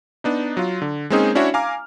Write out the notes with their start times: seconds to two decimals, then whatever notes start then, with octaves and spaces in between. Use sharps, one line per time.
0.24 B3 D4 D#4
0.57 F#3 F4
0.82 D3
1.10 G#3 A#3 C4 C#4 D#4 G#4
1.35 C#4 D4 E4 F#4 C#5 E5
1.54 F5 G#5 A#5 D6 F6